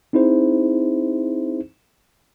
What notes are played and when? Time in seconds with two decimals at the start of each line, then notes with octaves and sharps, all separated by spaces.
0.13 C4 D#4 E4 G#4 C5